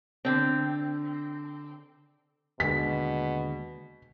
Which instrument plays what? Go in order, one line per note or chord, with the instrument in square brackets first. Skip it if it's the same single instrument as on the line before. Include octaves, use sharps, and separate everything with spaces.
[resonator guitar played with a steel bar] D3 C4
[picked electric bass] D#2 D3 G#3 [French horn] B2 [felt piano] B6